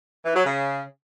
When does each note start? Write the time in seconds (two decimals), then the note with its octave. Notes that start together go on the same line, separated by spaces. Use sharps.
0.24 E3
0.34 F#3
0.45 C#3